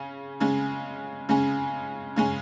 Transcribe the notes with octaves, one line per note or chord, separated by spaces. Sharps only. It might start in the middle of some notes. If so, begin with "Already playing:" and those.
Already playing: C#3 C#4
C#3 G#3 C#4
C#3 G#3 C#4
C#3 G#3 C#4